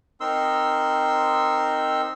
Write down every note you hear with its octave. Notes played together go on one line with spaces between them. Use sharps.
C4 D#4 A#4 C6 E6